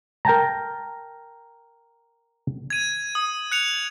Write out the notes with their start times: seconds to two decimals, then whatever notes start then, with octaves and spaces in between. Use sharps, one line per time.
0.25 A#4 G5 A5 A#5
2.70 G#6 D#7
3.15 D#6
3.51 F#6 C#7 F7